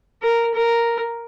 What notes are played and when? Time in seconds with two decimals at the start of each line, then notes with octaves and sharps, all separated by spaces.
0.22 A#4
0.54 A#4